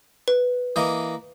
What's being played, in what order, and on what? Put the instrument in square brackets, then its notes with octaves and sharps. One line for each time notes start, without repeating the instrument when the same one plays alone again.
[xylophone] B4
[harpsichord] E3 A#3 D#5